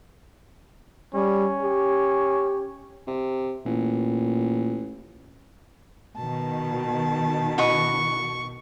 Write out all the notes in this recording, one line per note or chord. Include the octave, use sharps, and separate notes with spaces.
G3 C#4
G4
C3
A1 A#2
B2 D#3 A5
E4 F#4 D#5 C#6